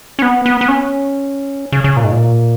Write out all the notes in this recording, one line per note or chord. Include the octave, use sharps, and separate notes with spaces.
C#4
B3
B3
B3
C#4
C#3
C#3
A#2
G#2
A#2